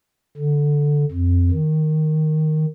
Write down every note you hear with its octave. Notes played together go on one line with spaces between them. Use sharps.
D3
F2
D#3